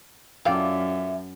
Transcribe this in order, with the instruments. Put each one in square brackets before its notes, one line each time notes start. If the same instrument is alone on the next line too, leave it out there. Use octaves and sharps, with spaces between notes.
[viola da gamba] F#2 [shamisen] E4 F5 G5 [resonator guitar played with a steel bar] F4 A4 D5 [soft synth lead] E5